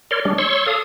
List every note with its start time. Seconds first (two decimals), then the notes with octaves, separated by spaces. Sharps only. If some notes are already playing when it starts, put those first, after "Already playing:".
0.11 A#4 C#5 D5 C6
0.25 G3 G#3 D4
0.38 C#5 C6 C#6 E6
0.66 A4 F5 D#6